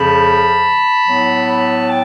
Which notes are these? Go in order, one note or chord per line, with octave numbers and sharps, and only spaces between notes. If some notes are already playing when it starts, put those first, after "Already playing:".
Already playing: F2 C#3 F3 A5 B5
A2 F#3 B3
G5 A5